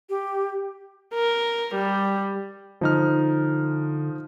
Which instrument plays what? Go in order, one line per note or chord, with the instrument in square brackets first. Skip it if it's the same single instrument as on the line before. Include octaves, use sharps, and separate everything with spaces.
[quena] G4
[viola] A#4
G3
[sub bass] D3 [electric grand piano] F3 D#4 F6